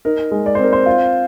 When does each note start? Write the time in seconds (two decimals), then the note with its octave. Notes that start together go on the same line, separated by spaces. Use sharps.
0.05 D#4 A#4
0.31 G#3
0.46 D5
0.55 C5
0.59 C4 A#4
0.73 C5
0.86 F4